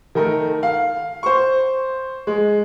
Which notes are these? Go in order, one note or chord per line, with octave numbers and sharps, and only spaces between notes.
D#3 A3 A#4
F5
C5 C#6
G#3